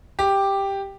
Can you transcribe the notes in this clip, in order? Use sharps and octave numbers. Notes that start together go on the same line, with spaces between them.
G4